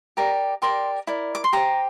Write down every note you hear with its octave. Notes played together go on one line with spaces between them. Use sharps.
G4 A#4 D5 A#5
G4 A#4 D5 C6
E4 A#4 D5
D6
C6
G4 C5 A#5